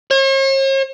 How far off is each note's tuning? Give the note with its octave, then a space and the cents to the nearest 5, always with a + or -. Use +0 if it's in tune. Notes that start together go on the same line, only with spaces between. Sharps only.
C#5 -45